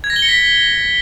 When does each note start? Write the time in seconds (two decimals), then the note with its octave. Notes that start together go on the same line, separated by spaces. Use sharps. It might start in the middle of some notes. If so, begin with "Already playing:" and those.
0.04 G#6
0.10 A#6
0.16 G7
0.22 C#7
0.28 B6